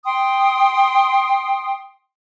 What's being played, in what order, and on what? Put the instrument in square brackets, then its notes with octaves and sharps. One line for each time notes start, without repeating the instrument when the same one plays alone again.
[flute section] G5 C6 D#6